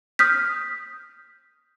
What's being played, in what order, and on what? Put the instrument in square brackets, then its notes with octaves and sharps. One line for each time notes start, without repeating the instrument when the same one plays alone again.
[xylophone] D#6 F6 G6 B6